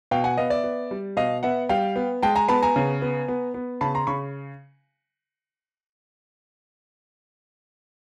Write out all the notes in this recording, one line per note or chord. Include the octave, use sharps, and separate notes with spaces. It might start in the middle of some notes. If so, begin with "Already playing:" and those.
B2 F5 G5
F#5 G#5
B3 D#5 F5
D5 E5
B3
G3
B2 D#5 F5
B3 E5 F#5
G3 F5 G5
B3
G#3 G5 A5
G#5 A#5
B3 A5 B5
G#5 A#5
C#3
B3
B3
B3
C#3 A5 B5
A#5 C6
C#3 B5 C#6